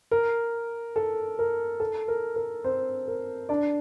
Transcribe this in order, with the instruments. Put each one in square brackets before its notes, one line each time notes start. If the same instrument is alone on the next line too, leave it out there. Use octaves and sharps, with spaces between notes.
[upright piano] A#4
A4
A#4
A4
A#4
A#4
C4 C5
A#4
D4 D5